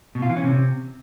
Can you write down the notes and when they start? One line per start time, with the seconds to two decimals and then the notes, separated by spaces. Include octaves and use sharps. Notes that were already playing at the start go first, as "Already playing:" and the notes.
0.15 B2
0.22 F4
0.29 E3
0.37 C#4
0.44 C3